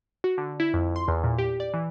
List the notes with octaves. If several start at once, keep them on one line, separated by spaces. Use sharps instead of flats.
F#4
D3
E4
F2
C6
E2
A#2
G4
D5
E3